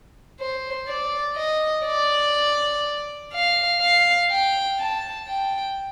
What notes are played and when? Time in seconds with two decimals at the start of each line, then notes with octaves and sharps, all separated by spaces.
0.40 C5
0.88 D5
1.37 D#5
1.86 D5
3.34 F5
3.81 F5
4.31 G5
4.79 A5
5.28 G5